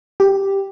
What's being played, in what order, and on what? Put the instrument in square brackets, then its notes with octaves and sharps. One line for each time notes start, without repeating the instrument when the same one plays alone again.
[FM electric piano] G4